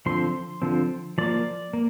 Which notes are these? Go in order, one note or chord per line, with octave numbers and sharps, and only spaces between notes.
D3 F3 C4 C6
D3 F3 C4
F3 A#3 D5
A#3